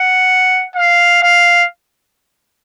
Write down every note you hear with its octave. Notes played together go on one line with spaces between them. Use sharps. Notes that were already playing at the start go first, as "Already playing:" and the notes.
Already playing: F#5
F5
F5